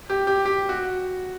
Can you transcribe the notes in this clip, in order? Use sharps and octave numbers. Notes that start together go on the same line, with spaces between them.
G4
G4
G4
F#4